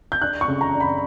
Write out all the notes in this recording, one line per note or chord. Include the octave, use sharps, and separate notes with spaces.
G6
D4 F#6
C#6
C#3
A#5
D4
B5